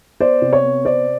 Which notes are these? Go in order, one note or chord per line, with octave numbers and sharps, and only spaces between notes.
B3 C5 D5
C3
C#5
B3
C3 C5 D5